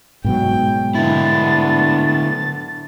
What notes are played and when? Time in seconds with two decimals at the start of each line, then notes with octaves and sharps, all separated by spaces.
0.24 G#2 B2 F#3 G5
0.95 D3 B3 D4 E4 A6
2.06 A6